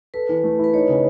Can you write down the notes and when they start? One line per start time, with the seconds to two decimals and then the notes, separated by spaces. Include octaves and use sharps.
0.14 A4 B4
0.29 E3
0.43 A3
0.59 E4
0.64 B4
0.74 D#4 C#5
0.89 C#3